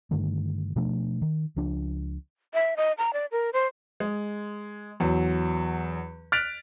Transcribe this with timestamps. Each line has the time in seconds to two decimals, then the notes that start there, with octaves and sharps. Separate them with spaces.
0.11 G2 D3 D#3 A3
0.76 B2 F3 A3 D4
1.22 D#3
1.57 C#2 F3 D4
2.54 E5
2.77 D#5
2.98 A#5
3.13 D5
3.32 A#4
3.53 C5
4.00 G#3
5.00 E2 F#3
6.32 F6 F#6 A6 B6 D7 F7